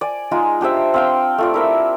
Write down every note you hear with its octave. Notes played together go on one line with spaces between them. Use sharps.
D5 G#5
G#3 D#4 F4 G#4
D4 G4 C5 E5
C4 F5 G5
A3 F4 D5
E4 A#4 E5